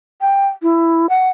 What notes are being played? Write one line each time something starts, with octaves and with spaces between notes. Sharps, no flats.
G5
E4
F#5